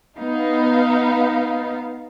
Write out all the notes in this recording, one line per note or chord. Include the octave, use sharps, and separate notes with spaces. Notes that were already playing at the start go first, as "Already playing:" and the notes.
B3 D#4 F5